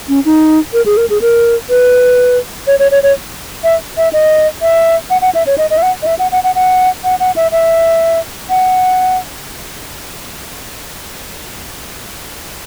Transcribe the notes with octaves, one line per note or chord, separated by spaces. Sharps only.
C#4
D#4
A#4
G#4
A#4
G#4
A#4
B4
C#5
C#5
C#5
C#5
E5
E5
D#5
E5
F#5
F#5
E5
C#5
D#5
D#5
E5
F#5
D#5
E5
F#5
F#5
F#5
F#5
F#5
F#5
E5
E5
F#5